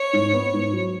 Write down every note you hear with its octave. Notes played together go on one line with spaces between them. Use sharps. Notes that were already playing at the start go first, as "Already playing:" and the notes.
Already playing: C#5
G#2
B3
G#2
F#3